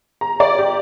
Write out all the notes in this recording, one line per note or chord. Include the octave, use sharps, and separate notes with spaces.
A#5
D5
G4